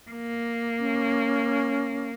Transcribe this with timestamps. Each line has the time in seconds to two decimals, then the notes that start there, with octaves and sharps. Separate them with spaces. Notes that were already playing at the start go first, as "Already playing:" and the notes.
0.11 A#3
0.80 C#4